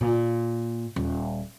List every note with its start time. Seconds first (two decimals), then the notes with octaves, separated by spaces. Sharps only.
0.01 A#2
0.96 D#1